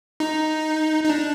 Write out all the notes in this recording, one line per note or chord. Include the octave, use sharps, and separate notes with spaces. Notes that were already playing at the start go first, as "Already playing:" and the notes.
D#4
D#4
D4